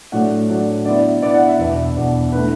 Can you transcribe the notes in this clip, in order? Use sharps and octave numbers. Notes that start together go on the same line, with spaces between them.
A2 F#3 A3 D4 F#5
A2 F#3 A3 D4
D3 B3 E4 D5
D3 B3 E4 D5
F#5
E5
E2 B2 B3 D4 E5
E2 B2 B3 D4
D3 A3 E4 B4